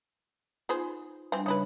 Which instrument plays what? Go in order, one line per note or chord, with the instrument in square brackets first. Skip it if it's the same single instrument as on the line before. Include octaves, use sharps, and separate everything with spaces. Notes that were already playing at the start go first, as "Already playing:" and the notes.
[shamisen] B3 G#4 C5 [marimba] D#4 F4
[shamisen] E3 C4 [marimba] G3 D4
[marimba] C#3 G3 C#5 [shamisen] D#4 E4 B4